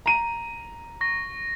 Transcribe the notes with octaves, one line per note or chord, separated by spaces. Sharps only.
A#5 D#7
C#6 A#6